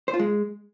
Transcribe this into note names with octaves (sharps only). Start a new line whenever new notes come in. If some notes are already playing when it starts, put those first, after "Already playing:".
C5
F4
G#3